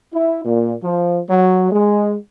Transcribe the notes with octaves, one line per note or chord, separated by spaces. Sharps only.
E4
A#2
F3
F#3
G#3